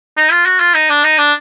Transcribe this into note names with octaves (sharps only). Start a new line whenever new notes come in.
D#4
F4
F#4
F4
D#4
D4
D#4
D4